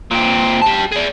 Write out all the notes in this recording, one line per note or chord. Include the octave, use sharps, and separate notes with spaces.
A#2 C4
G4 A5
G#4 D5